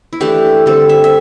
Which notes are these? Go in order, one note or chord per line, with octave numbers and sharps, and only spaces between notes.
E4
E3 A3 D4 G4
D3 G3 C4 A4
E5
E5